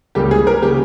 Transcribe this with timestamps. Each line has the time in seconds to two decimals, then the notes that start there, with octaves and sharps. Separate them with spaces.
0.15 C#2 C#3 G3 A#3 G4
0.31 G#4
0.47 A#4
0.62 C#3 G3 A#3 G4